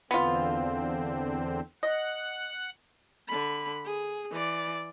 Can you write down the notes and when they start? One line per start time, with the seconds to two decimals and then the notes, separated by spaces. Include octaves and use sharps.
0.11 E2 D3 B3 C4 F4
1.83 D#5 F#5
3.28 D3 B5
3.85 G#4
4.31 E3 D5